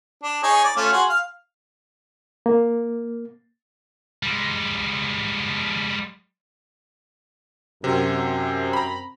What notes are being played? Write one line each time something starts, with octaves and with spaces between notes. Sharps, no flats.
D4
D#4 G#4 C#5
D5
A3 C#4 F4
F#4 G#4 C6
F5
A#3
G3 G#3
F#2 C3 C4
A#5 B5